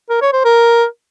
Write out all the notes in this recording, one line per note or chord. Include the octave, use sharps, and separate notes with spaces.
A#4
C#5
C5
A#4